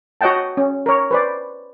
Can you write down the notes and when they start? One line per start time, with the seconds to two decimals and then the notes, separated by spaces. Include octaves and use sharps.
0.21 F#4 C#5 D#5 F#5 G5 A5
0.57 C#4
0.86 A#4 C#5
1.11 B4 C5 D5